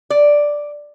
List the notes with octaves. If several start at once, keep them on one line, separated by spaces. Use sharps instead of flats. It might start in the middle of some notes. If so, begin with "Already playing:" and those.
D5